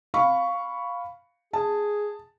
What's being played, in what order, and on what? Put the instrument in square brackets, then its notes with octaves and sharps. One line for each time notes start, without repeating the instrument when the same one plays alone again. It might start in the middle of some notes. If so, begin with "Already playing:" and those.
[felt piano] F5 B5 C#6
[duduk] G#4 [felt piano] A5